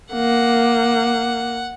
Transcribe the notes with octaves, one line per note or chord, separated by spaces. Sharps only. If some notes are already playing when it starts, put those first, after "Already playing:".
A#3 F#5